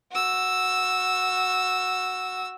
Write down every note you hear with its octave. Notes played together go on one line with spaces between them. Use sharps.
F#4 E6